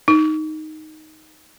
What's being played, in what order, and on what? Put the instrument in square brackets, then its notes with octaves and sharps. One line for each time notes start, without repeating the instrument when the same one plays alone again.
[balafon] D#4